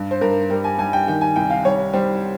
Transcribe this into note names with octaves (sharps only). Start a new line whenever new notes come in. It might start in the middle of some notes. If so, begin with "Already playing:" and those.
Already playing: G2
C5
G2 A#4
G3 A#4
G#5
G3 G#5
G5
D#3 G5
G#5
C2 G5
F5
G3 C#5
G3 C5